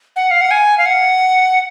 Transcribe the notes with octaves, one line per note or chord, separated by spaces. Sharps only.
F#5
F5
F#5
G#5
F5
F#5